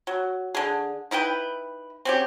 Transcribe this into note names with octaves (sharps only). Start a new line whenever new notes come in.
F#3
D3 G#4
D#4 E4 B4 G5
C4 C#4 G4